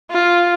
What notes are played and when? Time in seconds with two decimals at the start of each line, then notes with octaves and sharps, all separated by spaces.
0.11 F4